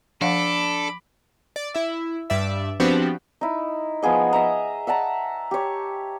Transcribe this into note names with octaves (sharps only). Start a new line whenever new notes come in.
F3 D4 A4 F5 F#5 B5 D6
D5
E4 E5
G2 D5 E5
F3 B3 C4 D4 F#4 G4
D#4 E4
F3 B3 G#4 D#5
D#5 E5 A#5
E5 F#5 A5 A#5
G4 C#5